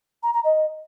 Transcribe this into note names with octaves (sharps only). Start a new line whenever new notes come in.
A#5
A#5
D#5